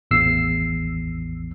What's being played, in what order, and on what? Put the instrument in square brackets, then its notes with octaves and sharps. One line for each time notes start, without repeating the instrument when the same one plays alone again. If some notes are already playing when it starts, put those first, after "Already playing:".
[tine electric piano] A1 E2 E6 C7